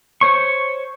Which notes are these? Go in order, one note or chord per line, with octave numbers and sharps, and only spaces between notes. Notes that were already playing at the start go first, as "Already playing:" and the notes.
C5 C#5 C#6